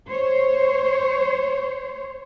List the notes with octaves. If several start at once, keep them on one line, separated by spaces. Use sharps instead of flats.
C5 C#5